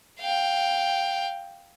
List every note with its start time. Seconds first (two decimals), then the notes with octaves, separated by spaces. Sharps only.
0.20 F5 G5